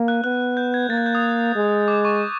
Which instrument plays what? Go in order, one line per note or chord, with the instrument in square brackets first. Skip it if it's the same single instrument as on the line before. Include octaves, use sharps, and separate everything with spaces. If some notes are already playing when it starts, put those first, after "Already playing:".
Already playing: [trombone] A#3
[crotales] F#6
[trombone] B3 [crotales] F#6
[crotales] G6
G#6
[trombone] A#3 [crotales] A6
[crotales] G#6
G6
D#6
[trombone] G#3
[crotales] D6
C#6